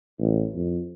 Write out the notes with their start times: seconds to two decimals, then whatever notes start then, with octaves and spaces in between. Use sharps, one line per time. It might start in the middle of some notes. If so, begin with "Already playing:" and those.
0.20 A1
0.55 F2